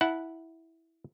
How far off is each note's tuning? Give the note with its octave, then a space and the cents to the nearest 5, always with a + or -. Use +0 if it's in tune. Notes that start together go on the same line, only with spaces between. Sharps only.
E4 -10 F#5 +0 A5 +0